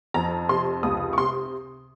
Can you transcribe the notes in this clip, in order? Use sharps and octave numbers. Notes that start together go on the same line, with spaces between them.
F2 A#5
C3 C6
C#2 D#6
C#6
C3 C6